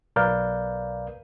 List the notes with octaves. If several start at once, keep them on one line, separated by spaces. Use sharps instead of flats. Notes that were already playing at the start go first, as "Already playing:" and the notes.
B1 A#4 B4 D5 F5 G6